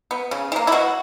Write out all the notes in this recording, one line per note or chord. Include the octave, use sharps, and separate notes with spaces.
B3
C#3
E3
A#3
E4
B2 F#4